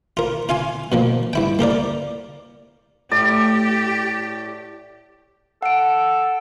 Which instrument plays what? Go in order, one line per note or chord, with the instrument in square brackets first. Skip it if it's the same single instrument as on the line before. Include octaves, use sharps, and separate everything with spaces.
[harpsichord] F4 A#4
F4 F5 G#5 C6
B2 F3 A#3
G2 E4 G5
A#3 G4 A#4 D5
[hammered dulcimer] A2 [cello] G4 [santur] D5
[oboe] A4 [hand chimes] F#5 D7